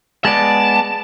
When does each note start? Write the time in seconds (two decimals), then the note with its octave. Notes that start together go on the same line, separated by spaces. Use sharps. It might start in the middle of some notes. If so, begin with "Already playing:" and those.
0.25 G#3 B3 D5 A5